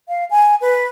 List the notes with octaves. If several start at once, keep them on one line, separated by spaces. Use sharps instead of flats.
F5
G#5
B4